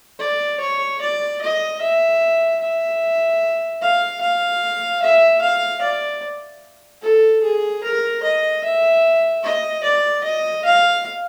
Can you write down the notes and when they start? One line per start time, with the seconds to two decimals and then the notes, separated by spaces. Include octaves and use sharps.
0.19 D5
0.60 C#5
1.01 D5
1.41 D#5
1.81 E5
2.60 E5
3.82 F5
4.21 F5
5.03 E5
5.42 F5
5.82 D5
7.02 A4
7.43 G#4
7.84 A#4
8.23 D#5
8.64 E5
9.43 D#5
9.83 D5
10.23 D#5
10.65 F5